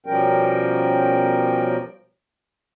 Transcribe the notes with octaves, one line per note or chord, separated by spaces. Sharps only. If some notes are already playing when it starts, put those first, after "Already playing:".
B2 F3 G3 C#4 A#4 G5